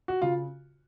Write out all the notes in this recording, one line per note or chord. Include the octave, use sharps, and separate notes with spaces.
F#4
C#3 F4